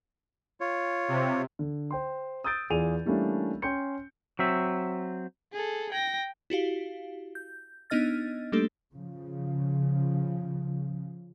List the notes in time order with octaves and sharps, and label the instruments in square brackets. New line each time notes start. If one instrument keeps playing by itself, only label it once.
[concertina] F4 C#5
[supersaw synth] C3
[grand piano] D3
C5 G5 C6
D#6 E6 G6 A6 D7
E2 F4 G#4 D5 D#7 F7
E3 G3 A3 A#3 C#4 D4
C#4 G5 C6 G6 C#7
[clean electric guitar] F#3 C4 E5
[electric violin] G#4 A4
G5 A#6
[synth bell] E4 F#4 G4 F5
G6
B3 D4 D#4 D#5 F6 A6
G3 A3 A#3 D4 G4 A4
[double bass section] C#3 F3